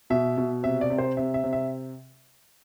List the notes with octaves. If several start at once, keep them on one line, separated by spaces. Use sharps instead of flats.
B2 E5
B2
C3 E5
D5
C3
C5
C3 E5
E5
C3
E5